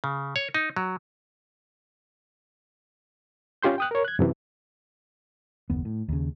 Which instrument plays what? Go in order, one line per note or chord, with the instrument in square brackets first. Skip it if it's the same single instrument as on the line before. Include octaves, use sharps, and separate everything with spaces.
[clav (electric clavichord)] C#3
C#5
D#4
F#3
[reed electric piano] C#4 F4 G4 C6 G6
G5 D#6 F#6
A#4 C#5
F#6 G#6
F#2 C3 E3
[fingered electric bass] F#1 D#2 B3
A2
D#2 C#3